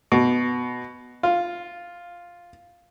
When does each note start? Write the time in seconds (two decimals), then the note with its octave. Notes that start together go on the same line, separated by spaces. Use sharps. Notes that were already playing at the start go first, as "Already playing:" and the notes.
0.12 B2
1.23 F4